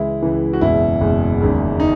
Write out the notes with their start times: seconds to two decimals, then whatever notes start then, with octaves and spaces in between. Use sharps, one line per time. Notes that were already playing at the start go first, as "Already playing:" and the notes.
Already playing: C#2 C#3 E3 G#3 E4
0.22 C#2 C#3 E3 G#3
0.53 F#4
0.61 F#1 E2 B2 G#3 E4
1.01 F#1 E2 B2 G#3
1.41 E1 D#2 C#3 G#3
1.80 D#4